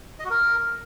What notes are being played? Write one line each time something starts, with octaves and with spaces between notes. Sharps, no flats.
D#5
F#4
A#4